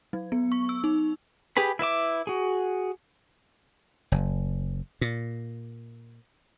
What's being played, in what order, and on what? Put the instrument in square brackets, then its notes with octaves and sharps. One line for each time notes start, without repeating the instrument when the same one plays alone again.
[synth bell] F#3
B3
C#6
E6
D#4
[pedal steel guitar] G4 G#4 B4 B5
E4 B4 E5 D6
F#4 G#4
[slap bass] F#1
A#2